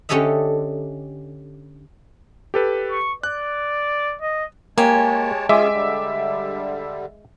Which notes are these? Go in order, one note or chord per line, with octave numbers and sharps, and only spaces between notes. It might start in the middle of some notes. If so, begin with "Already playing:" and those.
D3 C#4 G4 A4 D#5 E5
G4 A4 B4
C#6
D5 F#6
D#5
G#3 A#3 G4 C#5 G#5 A5
G#3 C#4 F4 G#4 E5 D6
D3 G3